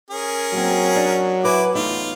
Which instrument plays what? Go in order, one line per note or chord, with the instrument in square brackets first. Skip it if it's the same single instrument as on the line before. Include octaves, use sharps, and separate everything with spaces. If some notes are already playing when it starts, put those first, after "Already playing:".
[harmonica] C#4 G#4 A#4
[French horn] F#3 [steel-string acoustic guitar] A#3 C4
[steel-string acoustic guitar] D4
[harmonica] E4 D6 [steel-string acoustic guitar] F#4 B4 G#5
[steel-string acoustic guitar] E2 A3 D#4 [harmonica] F4